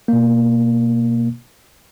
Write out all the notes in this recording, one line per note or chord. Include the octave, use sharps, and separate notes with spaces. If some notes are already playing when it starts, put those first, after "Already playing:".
B2 A#3